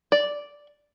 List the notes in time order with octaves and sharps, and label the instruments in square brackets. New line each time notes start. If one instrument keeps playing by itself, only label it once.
[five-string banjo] D5